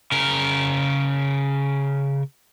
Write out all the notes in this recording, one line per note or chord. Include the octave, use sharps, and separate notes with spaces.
C#3 A#4